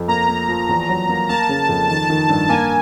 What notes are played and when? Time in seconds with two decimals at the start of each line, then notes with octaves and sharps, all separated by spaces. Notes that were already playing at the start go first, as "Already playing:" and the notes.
Already playing: F2
0.08 A#3 A#5
0.29 A#3
0.49 F3
0.69 E2
0.89 F#3
1.09 A#3
1.29 A#3 A5
1.49 C#3
1.69 F2
1.89 D#3 A5
2.10 D#3
2.29 G2
2.49 A#3 G#5